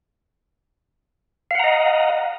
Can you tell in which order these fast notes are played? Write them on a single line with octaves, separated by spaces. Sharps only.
F5 F#5 A#5 D#5